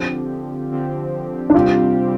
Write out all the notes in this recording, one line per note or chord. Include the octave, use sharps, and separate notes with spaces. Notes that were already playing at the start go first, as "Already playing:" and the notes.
Already playing: D3 F3 C4 G4
D3 F3 C4 G4
D4
C3 G3 C4 F4 G4